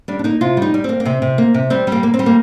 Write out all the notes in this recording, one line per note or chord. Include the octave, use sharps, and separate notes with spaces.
G3 D4
D4
A#3 D#4
C3 F4
G3 D#4
G3
A#3 C4
A#3
C3 C4
C3
A#3
C3
G3 C4
G3
A#3
A#3
C4
G3
A#3